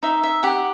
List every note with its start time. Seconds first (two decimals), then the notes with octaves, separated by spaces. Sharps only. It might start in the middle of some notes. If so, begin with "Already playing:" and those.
0.03 D#4 E5
0.23 E5
0.43 G4 F#5